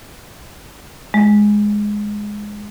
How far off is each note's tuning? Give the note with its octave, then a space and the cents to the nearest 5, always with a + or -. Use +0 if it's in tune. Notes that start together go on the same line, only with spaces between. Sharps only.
G#3 +0